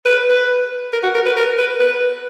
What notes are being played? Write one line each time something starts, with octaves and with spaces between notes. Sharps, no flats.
B4
B4
A#4
F#4
A#4
B4
A#4
B4
B4